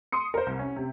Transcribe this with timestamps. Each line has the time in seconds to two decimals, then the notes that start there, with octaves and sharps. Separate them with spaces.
0.12 C6 D#6 C#7
0.34 A#4 C5
0.46 C2
0.59 C#4
0.76 C3